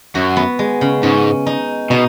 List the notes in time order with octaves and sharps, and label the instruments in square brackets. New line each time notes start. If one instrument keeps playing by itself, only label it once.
[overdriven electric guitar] F#2 [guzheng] F#4
[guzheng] B3
G#3
C#3
[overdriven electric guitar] G#2 [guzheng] C#4
[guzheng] D#4
[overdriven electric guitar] B2 [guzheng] D#4